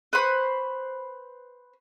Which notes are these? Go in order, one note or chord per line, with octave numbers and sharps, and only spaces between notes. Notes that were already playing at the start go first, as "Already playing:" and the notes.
B4 C5 B5 C#6